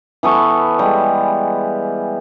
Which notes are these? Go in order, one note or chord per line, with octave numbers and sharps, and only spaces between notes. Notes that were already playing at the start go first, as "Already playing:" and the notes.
E3 B3 A4 C#6
G3 G#3